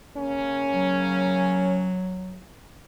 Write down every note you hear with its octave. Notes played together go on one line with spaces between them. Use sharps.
C#3 A#3 C#4
F#3